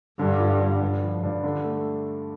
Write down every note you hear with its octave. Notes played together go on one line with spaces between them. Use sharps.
G2 D3
F4
D3
G2
F3
G2
D3
A3